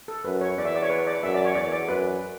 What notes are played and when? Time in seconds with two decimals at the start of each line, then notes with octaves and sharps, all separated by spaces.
0.08 A4
0.25 F#2 B4
0.41 C#5
0.58 E2 D5
0.65 E5
0.75 D5
0.82 C#5
0.90 B4
1.07 D5
1.23 F#2 E5
1.34 D5
1.45 C#5
1.55 E2 D5
1.72 D5
1.89 F#2 B4